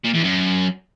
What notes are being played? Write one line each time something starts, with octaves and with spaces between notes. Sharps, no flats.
A#2
E2
F#2